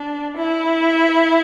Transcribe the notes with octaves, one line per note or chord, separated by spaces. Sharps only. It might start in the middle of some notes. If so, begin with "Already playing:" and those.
Already playing: D4
E4